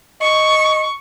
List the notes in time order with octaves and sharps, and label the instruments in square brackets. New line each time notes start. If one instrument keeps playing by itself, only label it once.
[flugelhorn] D#5 [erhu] C#6